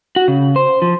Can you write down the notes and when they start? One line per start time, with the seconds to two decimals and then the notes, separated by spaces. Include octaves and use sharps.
0.16 F#4
0.28 C#3
0.56 C5
0.82 F3